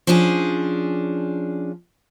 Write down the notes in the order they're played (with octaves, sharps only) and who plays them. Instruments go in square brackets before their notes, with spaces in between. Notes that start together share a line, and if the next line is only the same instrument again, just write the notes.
[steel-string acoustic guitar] F3 C#4 D4 G#4